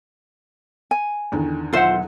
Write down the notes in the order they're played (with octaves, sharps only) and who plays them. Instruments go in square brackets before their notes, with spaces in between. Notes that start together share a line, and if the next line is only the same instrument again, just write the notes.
[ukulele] G#5
[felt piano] E2 D3 D#3
[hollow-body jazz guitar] B1 E5 F#5 [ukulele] F4 C5